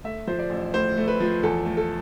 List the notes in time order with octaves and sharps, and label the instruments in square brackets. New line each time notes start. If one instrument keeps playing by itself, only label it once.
[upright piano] A3 E5
F3 C5
D5
A1
A2 C5
A3
B4
F3
E2 A4
A3
A4